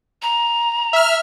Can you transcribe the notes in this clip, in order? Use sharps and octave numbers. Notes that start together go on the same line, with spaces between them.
A#5
E5 F6